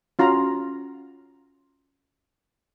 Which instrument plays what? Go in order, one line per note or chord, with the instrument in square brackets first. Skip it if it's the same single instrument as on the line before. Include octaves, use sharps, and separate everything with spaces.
[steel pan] C#4 F4 F#4 A#5